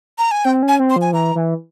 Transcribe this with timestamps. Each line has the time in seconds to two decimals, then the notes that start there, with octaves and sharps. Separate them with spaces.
0.18 A#5
0.31 G#5
0.45 C4 G5
0.63 C#4
0.68 G#5
0.79 C4
0.90 C6
0.96 F3
1.01 G#5
1.13 E3 A#5
1.35 E3